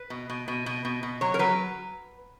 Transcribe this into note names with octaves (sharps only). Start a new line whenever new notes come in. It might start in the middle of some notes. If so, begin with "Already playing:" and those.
Already playing: B4
B2
B2
B2
B2
B2
B2
F#3 C#5
A#4
F#3 B4